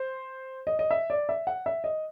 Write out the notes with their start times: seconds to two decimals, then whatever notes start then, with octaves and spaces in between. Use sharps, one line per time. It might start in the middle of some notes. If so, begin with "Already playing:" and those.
Already playing: C5
0.67 D#5
0.79 D#5
0.91 E5
1.10 D5
1.29 E5
1.47 F#5
1.66 E5
1.84 D#5